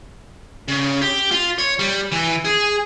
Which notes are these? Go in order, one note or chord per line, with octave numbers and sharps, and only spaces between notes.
C#3
G4
F4
C#5
G3
E3
G#4